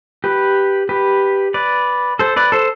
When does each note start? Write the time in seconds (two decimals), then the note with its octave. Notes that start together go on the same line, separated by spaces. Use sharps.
0.24 G4 B4
0.89 G4 B4
1.54 B4 D5
2.19 A4 C5
2.36 B4 D5
2.52 A4 C5